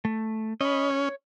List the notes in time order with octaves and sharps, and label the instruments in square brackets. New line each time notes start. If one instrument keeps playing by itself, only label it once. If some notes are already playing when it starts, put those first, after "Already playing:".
[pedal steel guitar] A3
[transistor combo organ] C#4 [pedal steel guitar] D#5 B5
[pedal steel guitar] C#5